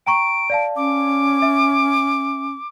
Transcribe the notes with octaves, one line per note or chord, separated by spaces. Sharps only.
G5 A#5 C#6 D7
D5 F5 A5
C#4 D6
E5